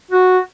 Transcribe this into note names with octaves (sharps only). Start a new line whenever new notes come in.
F#4